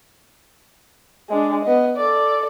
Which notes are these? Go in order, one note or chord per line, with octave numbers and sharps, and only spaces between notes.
G#3 D4
B3 D#5
A4 D5